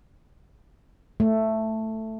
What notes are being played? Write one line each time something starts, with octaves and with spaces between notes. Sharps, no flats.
A3